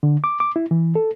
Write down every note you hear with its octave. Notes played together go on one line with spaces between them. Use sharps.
D3
D6
D6
E4
E3
A4